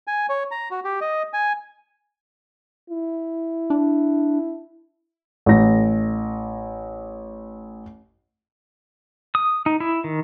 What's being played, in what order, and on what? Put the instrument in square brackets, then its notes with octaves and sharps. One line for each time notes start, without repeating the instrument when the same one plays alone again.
[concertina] G#5
C#5
A#5
F#4
G4
D#5
G#5
[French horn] E4
[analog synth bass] D4
[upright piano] A1 A#6
[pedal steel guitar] D#6
D#4
E4
D#3